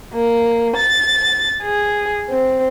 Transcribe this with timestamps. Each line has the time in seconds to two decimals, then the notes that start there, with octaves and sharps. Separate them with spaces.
0.13 A#3
0.76 A6
1.62 G#4
2.30 C4